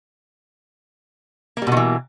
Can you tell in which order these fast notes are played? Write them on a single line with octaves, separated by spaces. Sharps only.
A#3 G3 B2 D#3 E3